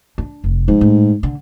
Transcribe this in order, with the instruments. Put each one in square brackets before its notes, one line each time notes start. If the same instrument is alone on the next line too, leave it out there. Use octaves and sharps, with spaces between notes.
[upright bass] D4
F1
[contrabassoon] G#2 [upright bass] F3
[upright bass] A2
D3